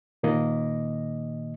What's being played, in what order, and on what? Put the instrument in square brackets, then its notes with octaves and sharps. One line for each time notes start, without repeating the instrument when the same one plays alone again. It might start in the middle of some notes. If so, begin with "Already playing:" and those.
[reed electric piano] A#2 D#3 A#3 D#5